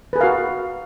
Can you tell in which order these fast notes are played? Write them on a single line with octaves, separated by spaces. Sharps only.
B4 G#4 A#4 F5 F#4